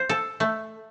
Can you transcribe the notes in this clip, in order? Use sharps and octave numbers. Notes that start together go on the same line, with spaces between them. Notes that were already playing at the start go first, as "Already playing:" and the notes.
Already playing: C5
A4
A3